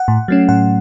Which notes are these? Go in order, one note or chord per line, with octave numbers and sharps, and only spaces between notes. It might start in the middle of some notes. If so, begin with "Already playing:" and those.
Already playing: F#5
A2
F#3 A3 C#4
A2 F#5